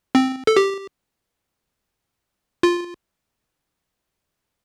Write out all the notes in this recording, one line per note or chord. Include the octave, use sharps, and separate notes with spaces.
C4
A4
G4
F4